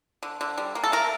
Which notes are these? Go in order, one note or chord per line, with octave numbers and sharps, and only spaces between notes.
D3
D3
G3
A#3
A4
A3 A#4